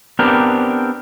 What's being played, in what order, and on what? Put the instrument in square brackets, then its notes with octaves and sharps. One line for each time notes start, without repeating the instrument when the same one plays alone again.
[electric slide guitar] B3 C4 D4 G4 A#4